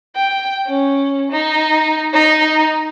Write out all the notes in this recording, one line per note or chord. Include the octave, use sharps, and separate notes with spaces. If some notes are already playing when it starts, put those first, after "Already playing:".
G5
C#4
D#4
D#4